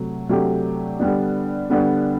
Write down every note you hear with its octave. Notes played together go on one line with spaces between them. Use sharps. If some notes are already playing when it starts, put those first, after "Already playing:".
Already playing: C3 F#3 A3
C3 F#3 A3 D4 G4
D3 G3 B3 D4
D3 G3 B3 D4